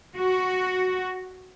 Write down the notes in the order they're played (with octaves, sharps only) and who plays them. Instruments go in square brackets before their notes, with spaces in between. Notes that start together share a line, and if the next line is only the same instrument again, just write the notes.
[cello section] F#4